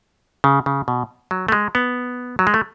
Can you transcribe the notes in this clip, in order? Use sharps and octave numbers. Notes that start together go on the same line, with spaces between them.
C#3
C#3
B2
F#3
A3
G#3
B3
F#3
G#3
A3